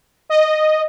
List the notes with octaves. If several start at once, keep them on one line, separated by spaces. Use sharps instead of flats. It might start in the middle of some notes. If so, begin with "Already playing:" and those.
D#5